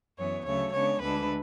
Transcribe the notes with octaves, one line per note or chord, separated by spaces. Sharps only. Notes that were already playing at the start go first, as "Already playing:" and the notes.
F#2 E3 B3 C#5
D2 C#3 F#3 A3 C#5
C#3 G#3 B3 D4 C#5
D2 D3 G#3 D4 B4